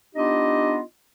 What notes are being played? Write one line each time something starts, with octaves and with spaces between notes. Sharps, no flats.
B3 D4 D#4 F4 G4 D#5